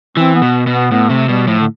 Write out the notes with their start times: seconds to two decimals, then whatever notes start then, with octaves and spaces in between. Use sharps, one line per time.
0.17 E3 C4
0.35 B3
0.42 B2
0.67 B2
0.73 B3
0.91 A2 B3
1.10 C3 A3
1.28 B2 G3
1.47 A2 F3
1.60 D3